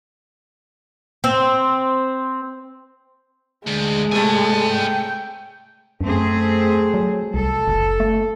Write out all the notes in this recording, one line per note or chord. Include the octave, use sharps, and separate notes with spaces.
C4
D2 G#3
C3 A3 A4 D5 G#5
G5
F#2 A3 C4 G#4
F#3
C2 A4
F#1
A3